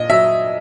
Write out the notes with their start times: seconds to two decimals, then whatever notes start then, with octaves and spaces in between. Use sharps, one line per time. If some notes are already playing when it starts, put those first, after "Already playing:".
Already playing: A#2 D#5
0.09 F#3 E5